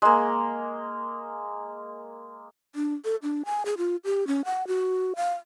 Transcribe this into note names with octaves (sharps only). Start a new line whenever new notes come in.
G#3 A#3
D4
A4
D4
G#5
G#4
F4
G4
C#4
F#5
F#4
F5